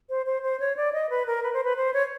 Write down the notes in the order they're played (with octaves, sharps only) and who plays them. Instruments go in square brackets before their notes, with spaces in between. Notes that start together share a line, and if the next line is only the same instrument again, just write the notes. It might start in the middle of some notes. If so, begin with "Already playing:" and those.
[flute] C5
C5
C5
C#5
D5
D#5
B4
A#4
B4
C5
B4
C5
C#5